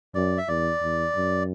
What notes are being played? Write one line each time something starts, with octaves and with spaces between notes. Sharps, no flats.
F#2 D5
E5
E2 D5
E2
F#2